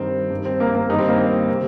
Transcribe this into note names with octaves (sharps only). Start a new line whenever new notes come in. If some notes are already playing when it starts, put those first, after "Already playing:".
Already playing: G2 D#3 C4
G2 D#3
C4
A#3
A#3
G2 D#3 D#4
C4
A#3
C4
C3 D#3